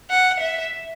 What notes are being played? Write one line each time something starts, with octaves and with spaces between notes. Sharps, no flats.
F#5
E5